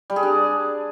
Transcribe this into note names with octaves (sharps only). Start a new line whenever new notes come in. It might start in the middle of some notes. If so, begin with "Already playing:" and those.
G3
G#4
D4